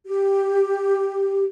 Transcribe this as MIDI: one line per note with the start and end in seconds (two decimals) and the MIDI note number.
0.06 1.44 67